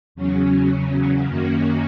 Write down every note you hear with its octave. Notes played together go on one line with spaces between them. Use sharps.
E2 C#3 F#3 C#4
F#2 D#3 A#3 C#4 F#4